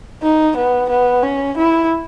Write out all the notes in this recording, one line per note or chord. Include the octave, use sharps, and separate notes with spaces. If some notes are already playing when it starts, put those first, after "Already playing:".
D#4
B3
B3
C#4
E4